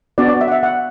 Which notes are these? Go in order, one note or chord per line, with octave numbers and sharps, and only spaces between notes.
B3 D4 F#4 D5
D5
E5
F#5
E5
F#5